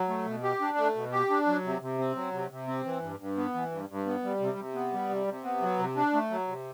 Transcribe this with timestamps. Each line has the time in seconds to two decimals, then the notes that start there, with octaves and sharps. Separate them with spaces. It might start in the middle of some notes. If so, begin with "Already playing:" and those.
Already playing: F#3
0.09 A3
0.26 B2
0.43 G4
0.61 D4
0.78 A3
0.95 B2
1.12 G4
1.30 D4
1.47 F#3
1.64 C3
1.81 C3
1.98 C4
2.15 F#3
2.33 C3
2.51 C3
2.67 C4
2.85 E3
3.02 G2
3.19 G2
3.37 B3
3.54 E3
3.71 G2
3.89 G2
4.06 B3
4.23 G3
4.40 C3
4.58 C3
4.75 B3
4.93 G3
5.09 C3
5.27 C3
5.44 B3
5.62 F#3
5.79 C3
5.96 D4
6.13 A3
6.30 F#3
6.48 C3